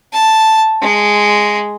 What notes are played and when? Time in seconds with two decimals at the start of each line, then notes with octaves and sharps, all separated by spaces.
0.13 A5
0.82 G#3